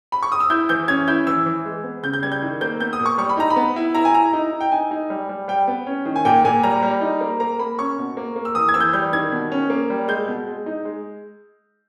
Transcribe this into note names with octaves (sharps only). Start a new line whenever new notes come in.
B5
C#6
D#6
E6
E4 G6
E3 G6
C#4 G#6
E4 G6
E3 E6
E3
G#3
B3
C#3 G6
G6
G3 G#6
G6
D#3
A#3 G6
B3 G6
D#6
A#2
C#6
G3 C#6
B5
D#4 A#5
B5
B3
E4
E4 A#5
G#5
E4 A#5
D#4
D#4
G5
D#4 G#5
D#4
G3
G3
G3 G5
B3
C#4
D#3
G#5
A#2 G5
A#2 G#5
G3 A#5
G3
D#4
A#3
A#3 A#5
A#3 B5
C#4 C#6
B2
A#3
A#3
E6
E3 D#6
G#6
E3 E6
G6
G3 G6
D#3 G#6
B2
C#4
A#3
G3
G#3 G6
B2
G#3
D#4
G#3